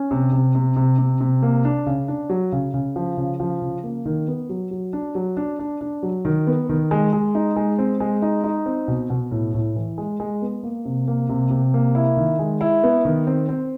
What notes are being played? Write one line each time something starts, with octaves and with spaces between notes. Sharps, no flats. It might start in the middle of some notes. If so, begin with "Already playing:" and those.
Already playing: C#4
C3
C3
C3
C3
C3
C3
A#3
D4
C#3
D4
F#3
C#3
C#3
F3
C#3
F3
C#3
A#3
D#3
B3
F#3
F#3
D4
F#3
D4
D4
D4
F#3
D#3
B3
D#3
G#3
G#3
D#4
G#3
C4
G#3
D#4
D#4
C4
B2
B2
A2
A2
E3
G#3
G#3
B3
A#3
C3
A#3
C3
C3
A#3
E4
D#3
G#3
E4
B3
D#3
C4
C4